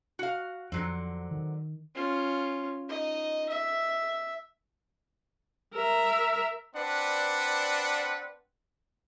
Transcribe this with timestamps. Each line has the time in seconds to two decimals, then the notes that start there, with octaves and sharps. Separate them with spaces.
0.19 F#4 F5
0.72 F2 D3 F#3 C4
1.31 D#3
1.95 C#4 F4
2.89 D#4 D#5
3.49 E5
5.75 A#4 E5
6.75 C4 D4 B4 D5 F#5